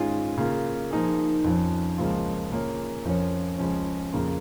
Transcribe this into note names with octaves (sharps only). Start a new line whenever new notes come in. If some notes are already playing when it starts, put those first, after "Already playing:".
Already playing: G#2 D#3 C#4 F4 G#4
C#3 A#3 F4
F3 A#3 D#4 G#4
F2 F3 C#4
C#2 C#3 F3 A#3 F4
C#3 A#3 F4 G#4 C#5
F2 F3 C#4 A#4 C#5
C#2 C#3 F3 C#4
F2 C#3 A#3 F4